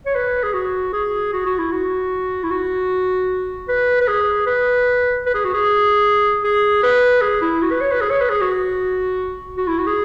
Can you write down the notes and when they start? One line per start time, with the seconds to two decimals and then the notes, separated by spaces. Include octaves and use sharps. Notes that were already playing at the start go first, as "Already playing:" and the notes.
0.06 C#5
0.15 B4
0.43 G#4
0.54 F#4
0.93 G#4
1.33 F#4
1.46 F#4
1.58 E4
1.72 F#4
2.44 E4
2.51 F#4
3.68 B4
4.01 B4
4.08 G#4
4.46 B4
5.26 B4
5.34 G#4
5.45 F#4
5.54 G#4
6.44 G#4
6.83 B4
7.21 G#4
7.42 E4
7.62 F#4
7.71 B4
7.81 C#5
7.91 B4
8.01 G#4
8.10 C#5
8.21 B4
8.30 G#4
8.41 F#4
9.57 F#4
9.67 E4
9.78 F#4
9.87 G#4